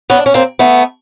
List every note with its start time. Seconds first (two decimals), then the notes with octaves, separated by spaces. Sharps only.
0.10 B3 C#4
0.19 D4
0.26 C#4
0.34 A#3 C4
0.59 A3 B3